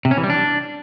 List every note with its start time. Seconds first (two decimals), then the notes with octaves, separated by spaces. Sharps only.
0.05 C3
0.11 C#4
0.17 E3
0.23 G3
0.30 D4